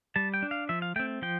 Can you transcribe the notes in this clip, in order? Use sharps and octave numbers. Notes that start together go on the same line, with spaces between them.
G3 A5
G5
D4
F5
F3 E5
F5
A3 C4 G5
F3 G5